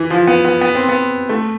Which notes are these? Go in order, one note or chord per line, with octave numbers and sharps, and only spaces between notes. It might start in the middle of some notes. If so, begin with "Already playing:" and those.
Already playing: E3
F3
B3
B3
B3
C4
B3
A3